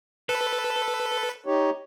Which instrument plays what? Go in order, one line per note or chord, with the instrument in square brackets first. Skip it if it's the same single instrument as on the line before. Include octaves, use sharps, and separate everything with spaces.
[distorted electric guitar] A4 [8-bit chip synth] B4
[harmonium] D#4 G4 C#5